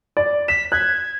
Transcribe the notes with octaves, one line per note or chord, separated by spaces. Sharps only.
D5
B6 E7
F#6 G#6